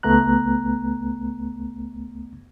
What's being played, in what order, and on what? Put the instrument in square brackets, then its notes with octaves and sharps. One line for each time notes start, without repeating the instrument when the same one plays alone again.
[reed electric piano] C#2 A3 B3 A#5 F#6